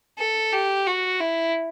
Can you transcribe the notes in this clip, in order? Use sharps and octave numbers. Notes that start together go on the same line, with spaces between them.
A4
G4
F#4
E4